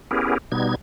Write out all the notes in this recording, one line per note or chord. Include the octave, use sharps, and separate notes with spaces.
B3 C#4 E4 G4 G#4 A#4
B2 G3 B3 D#4 G#6